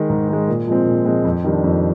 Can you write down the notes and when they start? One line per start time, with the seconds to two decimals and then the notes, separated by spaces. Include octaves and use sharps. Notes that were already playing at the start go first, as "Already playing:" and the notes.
Already playing: D#3 G#3
0.10 G#2
0.29 D#3 G#3
0.47 A#2
0.67 F3 G#3 C4
0.86 A#2
1.05 F3 G#3 C4
1.25 F2
1.44 D#3 G3 D4
1.64 F2